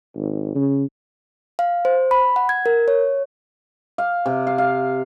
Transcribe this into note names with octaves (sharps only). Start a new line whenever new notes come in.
G#1
C#3
F5
C5
B5
F#5
G#6
A#4
C#5
F5
C3
F5
F5